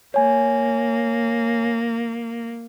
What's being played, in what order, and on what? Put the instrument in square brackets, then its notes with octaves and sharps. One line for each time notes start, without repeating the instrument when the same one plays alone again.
[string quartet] A#3 [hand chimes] C#5 G#5